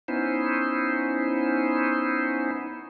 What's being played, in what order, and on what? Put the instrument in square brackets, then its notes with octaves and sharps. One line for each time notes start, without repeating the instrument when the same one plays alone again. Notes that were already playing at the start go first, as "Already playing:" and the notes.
[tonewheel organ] B3 C#4 D#4 E4 C5